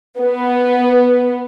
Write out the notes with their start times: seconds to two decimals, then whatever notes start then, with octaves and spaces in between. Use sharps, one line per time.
0.19 B3